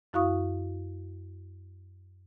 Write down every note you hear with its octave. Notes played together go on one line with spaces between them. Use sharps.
F#2 E4 F#4 F5 C#6 D#6